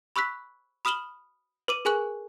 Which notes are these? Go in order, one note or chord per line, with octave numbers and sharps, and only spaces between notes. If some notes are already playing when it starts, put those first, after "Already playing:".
B5 C#6 E6 F#6 B6
B5 D#6 F6 E7 F#7 G7
B4 D6 D#7
G#4 A#4 G#5 C#6 F#6 F#7